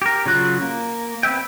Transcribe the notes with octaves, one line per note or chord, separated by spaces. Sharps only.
G4 A#4
C#3 F#3 F4 F#6
A#3
B3 C4 E5 G5